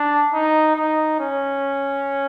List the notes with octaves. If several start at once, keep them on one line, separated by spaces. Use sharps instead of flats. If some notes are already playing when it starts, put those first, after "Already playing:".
Already playing: D4
D#4
D#4
C#4